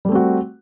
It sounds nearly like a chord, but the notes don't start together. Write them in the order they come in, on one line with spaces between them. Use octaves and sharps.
G3 A3 C4 F#4